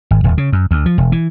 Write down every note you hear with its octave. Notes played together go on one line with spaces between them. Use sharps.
G#1
D#1
C#3
F#2
D2
F3
E1
E3